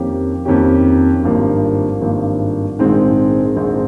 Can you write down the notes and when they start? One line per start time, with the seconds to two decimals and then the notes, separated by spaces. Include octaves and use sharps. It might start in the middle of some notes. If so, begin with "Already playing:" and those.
Already playing: F2 D#3 A#3 C#4 G4
0.45 F2 D#3 A#3 C#4 G4
1.23 G#1 G2 F3 A#3
2.01 G#1 G2 F3 A#3
2.79 A#1 G#2 D#3 G#3 C4
3.56 A#1 G#2 D#3 G#3 C4